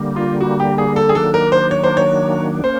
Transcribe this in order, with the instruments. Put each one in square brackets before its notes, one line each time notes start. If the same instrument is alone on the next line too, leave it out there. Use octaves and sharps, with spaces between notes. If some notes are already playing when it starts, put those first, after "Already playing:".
Already playing: [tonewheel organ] D3 G3 A#3
[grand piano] F4
F#4
G4
G#4
A4
G#4
[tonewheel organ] D#3 F#3 A#3 D4 [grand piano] A4
[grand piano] A#4
C5
C#5
C5
C#5
[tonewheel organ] A#3 C#4 [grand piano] C5